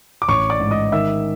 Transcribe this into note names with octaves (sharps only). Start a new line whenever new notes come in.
D6
A1 C#5 C#6
D5 D6
G#2
D#5 D#6
D#3 E5 E6